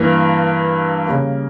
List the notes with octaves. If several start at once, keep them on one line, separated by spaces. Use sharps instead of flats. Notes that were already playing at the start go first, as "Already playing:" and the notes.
Already playing: G2 E3 A#3
C#3 G3 A#3